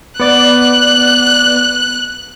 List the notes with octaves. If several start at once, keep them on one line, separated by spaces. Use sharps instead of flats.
B3 D5 F#6